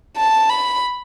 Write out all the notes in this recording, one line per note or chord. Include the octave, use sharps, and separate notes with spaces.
A5
B5